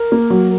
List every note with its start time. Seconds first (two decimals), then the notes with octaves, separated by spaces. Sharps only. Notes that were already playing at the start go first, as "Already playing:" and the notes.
Already playing: A#4
0.12 A#3
0.30 F#3